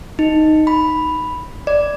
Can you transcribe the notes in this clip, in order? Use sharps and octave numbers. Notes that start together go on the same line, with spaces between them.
D#4
B5
D5